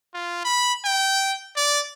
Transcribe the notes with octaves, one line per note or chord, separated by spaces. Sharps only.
F4
B5
G5
D5